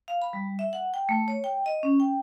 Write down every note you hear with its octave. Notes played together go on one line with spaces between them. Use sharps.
F5
B5
G3
E5
F#5
G5
A3
C#5
G5
D#5
C#4
G5